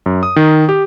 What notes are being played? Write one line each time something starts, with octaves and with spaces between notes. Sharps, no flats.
F#2
D#6
D#3
G4